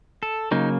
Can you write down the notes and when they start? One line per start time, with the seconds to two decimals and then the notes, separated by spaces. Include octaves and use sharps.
0.23 A4
0.51 C#3 F#3 A#3 D#4